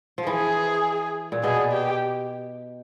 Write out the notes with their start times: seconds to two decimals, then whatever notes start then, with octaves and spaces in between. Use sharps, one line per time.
0.18 F3
0.27 E3 G#4
1.32 A#2
1.43 B2 G#4
1.72 G4